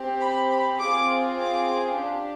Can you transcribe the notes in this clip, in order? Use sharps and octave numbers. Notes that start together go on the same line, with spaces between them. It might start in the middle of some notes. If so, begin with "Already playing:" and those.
Already playing: C4 G4
B5
B5
C4 F4 G#4 D6
D6
D4 G4